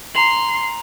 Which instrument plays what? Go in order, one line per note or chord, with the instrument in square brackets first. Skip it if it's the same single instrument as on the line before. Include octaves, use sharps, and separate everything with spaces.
[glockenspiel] A#5 F7 F#7 [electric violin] C6 C7